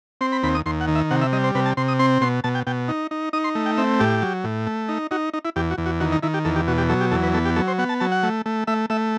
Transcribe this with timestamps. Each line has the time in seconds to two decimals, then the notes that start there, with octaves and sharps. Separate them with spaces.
0.21 C4 C6
0.32 B5
0.43 D#2 B5
0.55 D#6
0.66 D#2 C6
0.81 F#5
0.88 D#3
0.95 E5
1.11 C3 F#5
1.22 E5
1.32 G3 D#5
1.44 C5
1.55 C3 B4
1.66 A5
1.77 C3 C6
1.88 D#6
1.99 C4 C6
2.21 B2 C6
2.44 B2 A5
2.55 G5
2.67 B2 G5
2.88 D#4
3.11 D#4
3.33 D#4 D#6
3.44 C6
3.55 A3
3.66 G5
3.78 C4 E5
4.00 A2 G4
4.22 F#3
4.44 A2
4.67 A3
4.89 D#4
5.11 D#4 F#4
5.33 D#4
5.45 E4
5.56 E2 G4
5.71 F#4
5.78 E2
5.86 F#4
6.00 D#3 F#4
6.12 D#4
6.23 D#3 E4
6.34 G4
6.45 E2 A4
6.56 G4
6.67 B2 F#4
6.78 G4
6.89 F#3 A4
7.01 G4
7.11 E2 A4
7.23 B4
7.34 B3 A4
7.45 G4
7.56 F#3 A4
7.68 C5
7.78 B3 F#5
7.89 A5
8.00 F#3 A5
8.12 F#5
8.23 A3
8.46 A3
8.67 A3 E5
8.90 A3 E5